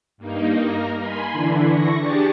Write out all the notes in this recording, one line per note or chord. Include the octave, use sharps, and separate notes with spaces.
G2 A#3 D#4
A#4 A#5
G#5 B5 C6
D3 E3 D4 E4
C#6 A#6
D4 G4 G#4 A6 C#7